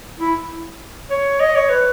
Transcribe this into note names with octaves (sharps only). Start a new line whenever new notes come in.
E4
C#5
D#5
C#5
B4